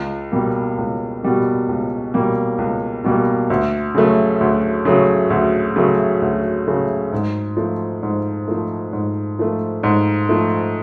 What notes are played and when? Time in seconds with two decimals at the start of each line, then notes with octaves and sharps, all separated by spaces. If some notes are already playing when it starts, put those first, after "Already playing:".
Already playing: C#2
0.32 B2 G3 A#3
0.78 C#2
1.23 B2 G3 A#3
1.69 C#2
2.14 B2 G3 A#3
2.58 C#2
3.04 B2 G3 A#3
3.50 D2
3.95 C#3 F#3 A3
4.41 D2
4.85 C#3 F#3 A3
5.30 D2
5.76 C#3 F#3 A3
6.22 D2
6.67 C#3 F#3 A3
7.12 G#2
7.57 F3 A3
8.03 G#2
8.48 F3 A3
8.93 G#2
9.39 F3 A3
9.83 G#2
10.29 F3 A3